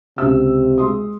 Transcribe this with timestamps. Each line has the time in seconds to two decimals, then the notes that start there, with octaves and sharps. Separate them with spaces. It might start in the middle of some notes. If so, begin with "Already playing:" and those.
0.18 C#2 C3 E6
0.78 G#3 C6 D#6